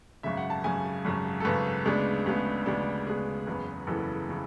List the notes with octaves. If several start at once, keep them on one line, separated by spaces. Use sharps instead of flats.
G#1 F#2 C#3 E5
F#5
A5
G#1 F#2 C#3 G#5
G#1 F#2 C#3
A4
G#1 F#2 C#3 B4
D2 C#3 G#3 B3 D4
D2 C#3 G#3 B3 D4
D2 C#3 G#3 B3 D4
D2 C#3 G#3 B3 D4 G#4
F#1 E2 C#3 E3 B3
F#1 E2 C#3 E3 B3 A4
C#3 E3